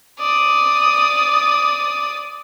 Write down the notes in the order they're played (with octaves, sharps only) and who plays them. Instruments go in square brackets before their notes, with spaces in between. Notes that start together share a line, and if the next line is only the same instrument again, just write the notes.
[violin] D5 D#6